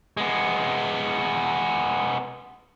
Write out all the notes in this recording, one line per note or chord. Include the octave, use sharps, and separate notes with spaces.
G#3 B3